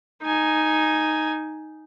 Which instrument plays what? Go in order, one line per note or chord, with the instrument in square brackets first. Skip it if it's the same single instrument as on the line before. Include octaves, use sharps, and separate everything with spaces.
[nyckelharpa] D#4 G#5